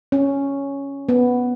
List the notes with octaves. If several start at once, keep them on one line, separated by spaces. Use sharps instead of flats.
C#4
B3